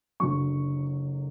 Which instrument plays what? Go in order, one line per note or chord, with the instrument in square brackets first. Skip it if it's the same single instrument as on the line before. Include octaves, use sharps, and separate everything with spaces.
[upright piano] F#1 F#2 D3 F#3 C#6